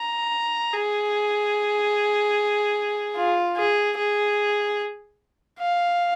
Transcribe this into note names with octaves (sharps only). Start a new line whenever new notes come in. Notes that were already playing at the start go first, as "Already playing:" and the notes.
Already playing: A#5
G#4
F4
G#4
G#4
F5